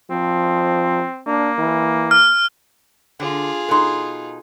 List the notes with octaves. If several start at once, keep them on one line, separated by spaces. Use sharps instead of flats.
F3 C4
A#3 D4
E3
F6
D3 F4 G#4
B2 D#4 A4 C6